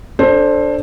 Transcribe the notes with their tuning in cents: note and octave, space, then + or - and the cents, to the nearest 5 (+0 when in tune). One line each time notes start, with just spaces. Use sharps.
D4 +0 A4 +0 C5 +20